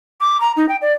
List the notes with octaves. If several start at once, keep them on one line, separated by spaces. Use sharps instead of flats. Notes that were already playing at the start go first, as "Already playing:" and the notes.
D6
A#5
D#4
G5
D5